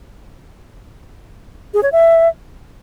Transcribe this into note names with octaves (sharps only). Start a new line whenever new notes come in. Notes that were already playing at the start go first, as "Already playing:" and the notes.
G#4
C#5
E5